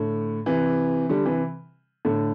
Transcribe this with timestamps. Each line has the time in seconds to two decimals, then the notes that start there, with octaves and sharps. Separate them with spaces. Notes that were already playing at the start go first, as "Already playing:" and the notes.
Already playing: A2 D3
0.46 C3 E3
1.09 D3 G3
1.25 C3 E3
2.05 A2 D3